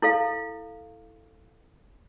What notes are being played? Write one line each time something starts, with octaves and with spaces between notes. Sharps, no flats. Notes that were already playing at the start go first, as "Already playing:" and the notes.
E4 A4 F5